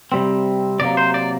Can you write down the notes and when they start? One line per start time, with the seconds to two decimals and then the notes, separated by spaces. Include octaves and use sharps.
0.12 C3 G3 C4
0.80 C3 F#3 A#3 D5
0.97 C5
1.14 D5